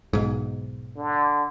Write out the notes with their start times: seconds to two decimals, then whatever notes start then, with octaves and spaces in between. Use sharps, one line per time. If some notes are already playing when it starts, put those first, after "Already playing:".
0.13 B1 G#2
0.96 D3